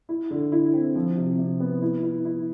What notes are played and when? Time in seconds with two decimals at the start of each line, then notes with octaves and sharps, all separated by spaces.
0.09 E4
0.31 D3
0.52 E4
0.74 C4
0.95 F3
1.17 C3
1.38 C3
1.60 B3
1.82 E4
2.03 E4
2.25 E4